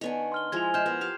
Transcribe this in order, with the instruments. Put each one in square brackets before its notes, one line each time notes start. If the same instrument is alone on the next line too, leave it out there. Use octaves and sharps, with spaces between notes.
[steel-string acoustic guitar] D#3 B3 D4 [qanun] C#5 G#5
[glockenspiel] C6 F6 G7
[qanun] F3 G#3 E4 [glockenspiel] G#6 F7
[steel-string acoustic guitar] G#3 E4 [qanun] C6 [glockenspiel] F6 G6 E7
[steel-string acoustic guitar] B3 F#5 [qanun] A#4
[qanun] G4 F5